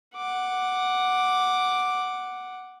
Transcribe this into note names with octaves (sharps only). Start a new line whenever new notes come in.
F#5 D6